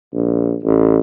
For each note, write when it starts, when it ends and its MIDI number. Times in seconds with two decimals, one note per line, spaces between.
0.13 0.56 34
0.64 1.00 33